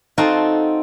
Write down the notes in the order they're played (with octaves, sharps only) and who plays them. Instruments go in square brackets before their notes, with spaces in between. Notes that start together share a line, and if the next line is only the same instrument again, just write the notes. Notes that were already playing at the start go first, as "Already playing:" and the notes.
[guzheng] C4 D#4 F4 F#4 A4